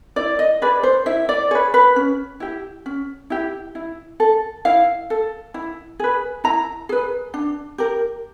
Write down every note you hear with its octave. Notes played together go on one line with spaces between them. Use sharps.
E4 D5
D#5
G#4 B4 D5
C5
E4 E5
D5
G#4 B4 C#5
B4
C#4
E4 G4
C#4
E4 G4
E4
A4
E4 F5
A4
E4
G#4 B4
E4 A#5
G#4 B4
D4
G4 A#4